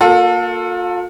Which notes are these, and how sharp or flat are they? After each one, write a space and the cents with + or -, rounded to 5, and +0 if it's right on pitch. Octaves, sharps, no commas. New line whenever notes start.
A#3 +0 F4 +40 A4 +15